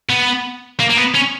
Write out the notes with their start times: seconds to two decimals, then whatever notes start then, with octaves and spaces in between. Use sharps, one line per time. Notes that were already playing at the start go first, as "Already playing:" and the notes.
0.10 B3
0.80 A#3
0.90 A#3
0.97 B3
1.14 C#4